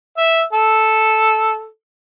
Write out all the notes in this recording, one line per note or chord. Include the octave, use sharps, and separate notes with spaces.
E5
A4